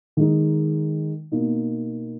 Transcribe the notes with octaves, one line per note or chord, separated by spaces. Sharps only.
D#3 G#3 D#4
B2 A#3 D#4